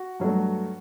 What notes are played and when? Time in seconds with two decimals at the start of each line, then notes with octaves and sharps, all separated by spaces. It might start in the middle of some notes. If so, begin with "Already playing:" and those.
Already playing: F#4
0.20 G2 F#3 A3